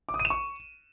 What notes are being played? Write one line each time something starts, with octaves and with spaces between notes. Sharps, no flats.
D6
D#6
D#7
E7
C#6